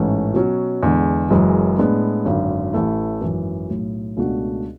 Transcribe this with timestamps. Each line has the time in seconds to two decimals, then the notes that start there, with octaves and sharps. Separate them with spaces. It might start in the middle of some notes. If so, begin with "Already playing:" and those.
Already playing: A1 G#2 E3 A3 C#4
0.34 B2 F#3 C#4
0.83 E2 D3 G#3
1.30 F#1 F#2 E3 G#3
1.78 A2 G#3 B3 D4
2.25 G#1 F#2 D3
2.73 A1 A2 E3 A3 E4
3.21 G#1 F#2 E3
3.69 B1 A2 F#3
4.17 C#2 B2 A3 D4 F#4